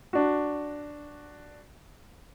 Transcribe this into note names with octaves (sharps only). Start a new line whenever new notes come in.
D4 F#4